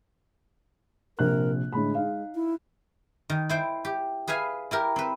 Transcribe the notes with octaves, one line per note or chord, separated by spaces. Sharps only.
A#1 C3 A#4 F#6
A2 D3 G#3 B5
D#4 F5
E4
D#3
E4 C5 G5
G4
G#4 B4 E5 F5 G#5
E4 G4 A#4
C4 B4